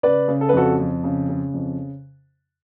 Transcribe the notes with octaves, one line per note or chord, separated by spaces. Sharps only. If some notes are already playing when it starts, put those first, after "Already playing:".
C#3 B4 D5
C#3
A4
B4
F2 F#4 A4
F2
C#3
C#3
F2